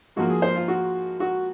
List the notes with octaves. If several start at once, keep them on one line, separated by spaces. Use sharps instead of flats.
G#2 F3 A#3 F#4
G#4
C5
F4
F#4
F#4